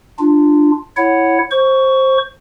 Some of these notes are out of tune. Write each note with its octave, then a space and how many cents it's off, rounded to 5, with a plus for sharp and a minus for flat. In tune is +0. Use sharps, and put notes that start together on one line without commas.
D4 +15 F4 -10
E4 +0 C#5 +0 F#5 +0
C5 +15 C#6 +15